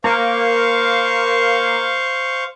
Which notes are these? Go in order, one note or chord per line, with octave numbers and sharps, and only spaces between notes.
A#3 C5 F5 C#6